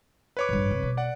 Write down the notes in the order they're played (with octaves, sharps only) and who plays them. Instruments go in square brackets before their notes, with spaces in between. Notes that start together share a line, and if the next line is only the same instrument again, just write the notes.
[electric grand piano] B4 C#5 D6
[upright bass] A1 G2
F1
B2
[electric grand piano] D5 F#5